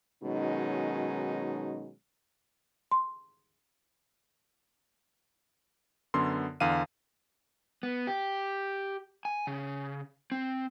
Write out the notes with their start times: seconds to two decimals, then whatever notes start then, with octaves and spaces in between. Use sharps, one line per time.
0.24 B2 D#3 F#3 G#3 C#4 D#4
2.91 C6
6.14 F#2 D3 B3 C6
6.60 E2 D3 F5 D#7
7.83 B3
8.07 G4
9.25 G#5
9.47 C#3
10.32 C4